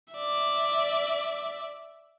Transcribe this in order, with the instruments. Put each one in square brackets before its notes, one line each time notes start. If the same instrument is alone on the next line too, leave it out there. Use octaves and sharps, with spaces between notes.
[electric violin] D5 E5